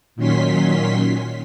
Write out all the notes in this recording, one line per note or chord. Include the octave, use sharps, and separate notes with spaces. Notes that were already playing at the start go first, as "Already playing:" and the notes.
A#2 D#3 F#3 C#4 C6 B6